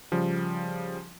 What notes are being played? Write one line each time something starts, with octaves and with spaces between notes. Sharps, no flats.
C#3 F3 G3